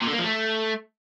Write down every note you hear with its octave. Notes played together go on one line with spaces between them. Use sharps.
A#2
D3
A#3
F3
A3